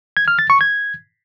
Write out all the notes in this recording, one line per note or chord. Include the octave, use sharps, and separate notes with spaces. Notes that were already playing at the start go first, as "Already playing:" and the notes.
G#6
F6
A6
C#6
G#6